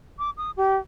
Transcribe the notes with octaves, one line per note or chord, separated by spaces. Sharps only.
D6
D#6
G4